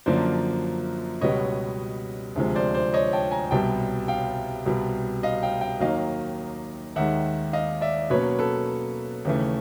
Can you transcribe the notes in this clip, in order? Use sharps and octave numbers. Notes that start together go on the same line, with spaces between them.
F#2 D3 F3 A#3 C5 D5
C#2 B2 G3 B3 C#5 D#5
D2 C3 F3 G#3
C5 D5
C5 D5
C#5 D#5
G5 A5
G#5 A#5
C2 B2 G3 G5 A5
F5 G5
C2 B2 G3
D#5 F5
F5 G5
F5 G5
D#2 D#3 F#3 A#3 D#5 F5
D#2 D#3 G#3 E5 F#5
D#5 F5
D5 E5
B2 F#3 A#3 C#4 B4 C#5
A4 B4
D#2 C#3 E3 A3